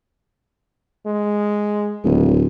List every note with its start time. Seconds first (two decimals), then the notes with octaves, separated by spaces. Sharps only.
1.06 G#3
2.04 D1 C#2